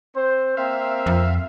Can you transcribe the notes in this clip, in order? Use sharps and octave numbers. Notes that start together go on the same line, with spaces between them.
C4 C5
A#3 C4 E5 F5
F2